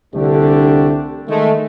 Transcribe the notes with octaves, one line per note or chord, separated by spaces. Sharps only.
C2 D3 A3 D4 G4
D#3 G#3 A3